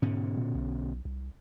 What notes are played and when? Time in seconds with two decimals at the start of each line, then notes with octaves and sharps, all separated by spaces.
0.02 G#2 B2 D3 C#4
0.37 A#2
0.55 B1
1.05 C2